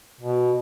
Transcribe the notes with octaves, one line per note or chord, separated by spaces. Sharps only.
B2